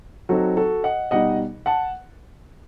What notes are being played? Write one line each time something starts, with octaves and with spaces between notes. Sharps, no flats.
F#3 C4 D#4 F#4 A4
F#4 A4
D#5 F#5
B2 G3 D#4 D#5 F#5
F#5 A5